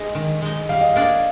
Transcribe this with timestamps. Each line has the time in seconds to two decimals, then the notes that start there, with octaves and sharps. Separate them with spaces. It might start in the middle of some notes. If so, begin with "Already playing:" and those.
Already playing: G#3 D#4 D#5
0.15 D#3
0.42 G#3 D#4
0.69 G3 F5
0.81 D#5
0.94 A#3 D4 G#4 D5 F5